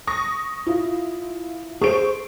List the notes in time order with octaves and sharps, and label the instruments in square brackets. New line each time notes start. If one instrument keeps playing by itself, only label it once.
[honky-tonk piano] C#6 D#6 A#6
E4 F4
[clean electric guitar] G#4 A4 C5 [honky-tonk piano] C#6 D7